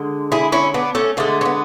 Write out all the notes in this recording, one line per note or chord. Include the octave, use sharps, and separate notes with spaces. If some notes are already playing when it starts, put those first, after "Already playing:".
Already playing: D3 G#3
E4 G#4
C#4 E4
B3 D4
A3 C#4
D3 G#3 A3
C#4
B3